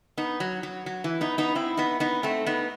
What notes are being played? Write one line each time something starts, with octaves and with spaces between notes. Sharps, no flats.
B3 D#4
F#3
F#3
F#3
E3
B3 D#4
B3 D#4
C4 E4
B3 D#4
B3 D#4
A3 C4
B3 D#4